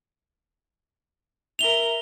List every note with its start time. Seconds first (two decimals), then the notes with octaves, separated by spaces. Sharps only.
1.59 A#4 E5 F7 G7